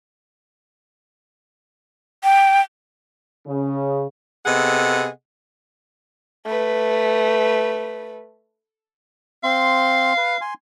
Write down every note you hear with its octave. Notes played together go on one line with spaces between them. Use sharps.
G5
C#3
C3 B3 G#4 A4 D#5 F#5
A3 B4
C4 F5 C6
B4
G#5 C6